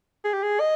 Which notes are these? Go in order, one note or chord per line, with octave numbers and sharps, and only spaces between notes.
G#4
G4
G#4
D#5